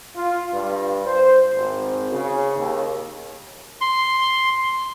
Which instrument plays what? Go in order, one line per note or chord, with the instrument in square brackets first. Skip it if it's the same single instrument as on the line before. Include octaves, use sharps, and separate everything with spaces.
[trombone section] F4
G2
C5
G#1
C#3
D#2
[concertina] C6